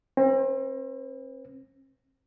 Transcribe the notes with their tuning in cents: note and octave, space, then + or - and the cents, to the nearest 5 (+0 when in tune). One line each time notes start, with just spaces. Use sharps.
C4 +40 B4 +0